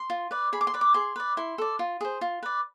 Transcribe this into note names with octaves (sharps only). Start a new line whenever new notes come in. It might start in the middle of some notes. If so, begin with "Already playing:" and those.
Already playing: C6
F4
B4 D5
G#4 B5
D6
C6
B4 D5
D6
G#4 C6
B4 D5
E4 C6
A4 D5
F4
G#4 C5
F4
B4 D5